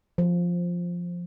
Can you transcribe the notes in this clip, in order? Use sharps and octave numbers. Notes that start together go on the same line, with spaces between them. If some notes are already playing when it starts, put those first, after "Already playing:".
F3